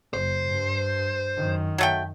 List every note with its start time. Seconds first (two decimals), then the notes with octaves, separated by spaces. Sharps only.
0.14 F#1 C5
0.49 G2
1.37 F#2 D#3
1.78 F#3 A3 G5